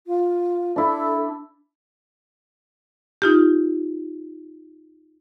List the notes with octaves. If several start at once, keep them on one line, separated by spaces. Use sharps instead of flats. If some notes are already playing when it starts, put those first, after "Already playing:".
F4
D4 E4 A4
D#4 F4 G4